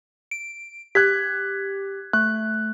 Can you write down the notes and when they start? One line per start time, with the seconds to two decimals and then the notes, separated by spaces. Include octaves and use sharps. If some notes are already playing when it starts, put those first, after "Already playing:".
0.31 D7
0.95 G4 F#6 G#6 B6
2.13 A3 F#6